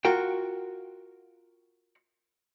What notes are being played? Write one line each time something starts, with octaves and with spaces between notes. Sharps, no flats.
F4 F#4 A#4 G5